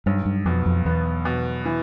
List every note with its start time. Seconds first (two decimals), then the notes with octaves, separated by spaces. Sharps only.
0.06 B1 G2
0.26 G2
0.45 F2 B2
0.66 F2
0.85 E2 B3
1.25 B2
1.65 E3